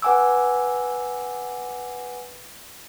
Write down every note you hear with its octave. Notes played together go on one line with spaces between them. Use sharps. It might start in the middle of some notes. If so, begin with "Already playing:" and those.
B4 F#5 G#5 D6 E6